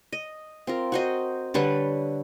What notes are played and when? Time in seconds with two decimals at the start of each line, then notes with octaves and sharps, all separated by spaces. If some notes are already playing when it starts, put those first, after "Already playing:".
0.12 D#5
0.67 C4 F4 A#4
0.92 F#4 C5 D#5
1.54 D3 G3 B4 C#5